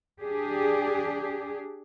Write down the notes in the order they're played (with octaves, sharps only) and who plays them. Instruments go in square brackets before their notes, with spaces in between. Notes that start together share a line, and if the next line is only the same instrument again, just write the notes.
[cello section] D4 G4 G#4